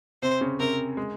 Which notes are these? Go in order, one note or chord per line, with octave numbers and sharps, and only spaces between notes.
C3 C4 C5
C#3 C#4
C3 C4 A#4
G#3